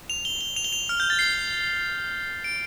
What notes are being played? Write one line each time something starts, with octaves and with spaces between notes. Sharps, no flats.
F7
G7
G7
F7
G7
F7
F6
G6
A6
C7
D7